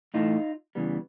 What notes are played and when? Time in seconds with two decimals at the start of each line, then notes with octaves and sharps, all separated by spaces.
0.14 A2 E3 A3 D#4 F4
0.75 C#3 E3 G3 B3